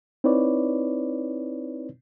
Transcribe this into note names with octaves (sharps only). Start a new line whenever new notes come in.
C4 D#4 E4 B4 C#5 D5